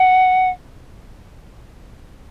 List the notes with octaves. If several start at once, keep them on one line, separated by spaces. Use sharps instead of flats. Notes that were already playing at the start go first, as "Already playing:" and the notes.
Already playing: F#5